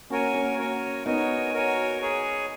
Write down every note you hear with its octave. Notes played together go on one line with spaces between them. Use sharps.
A#3 C#4 F#4 A#4 C#5 G#5
A#3 C#4
F#4 A#4 C#5 G#5
B3 D#4 F#4 A#4 C#5 G#5
F#4 A#4 C#5 G#5
G#4 C#5 G#5